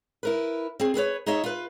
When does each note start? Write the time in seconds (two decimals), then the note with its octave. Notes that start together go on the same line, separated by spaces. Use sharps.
0.23 E4 A#4 B4
0.80 C4 G#4
0.94 G#4 A4 B4 C#5
1.26 D#4 G#4 C#5 D#5 E5
1.44 F4 B4